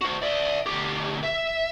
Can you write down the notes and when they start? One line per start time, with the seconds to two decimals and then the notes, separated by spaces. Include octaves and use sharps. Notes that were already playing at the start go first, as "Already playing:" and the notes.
0.01 F#4 C5
0.22 D5 E5
0.66 D2 G4
1.24 E5